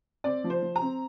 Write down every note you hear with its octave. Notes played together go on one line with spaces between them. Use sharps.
C4 D5
F3
C5
F3
A#5
C4